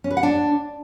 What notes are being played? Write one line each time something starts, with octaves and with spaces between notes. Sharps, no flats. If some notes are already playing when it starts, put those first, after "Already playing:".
C#4
B4
F#5
D4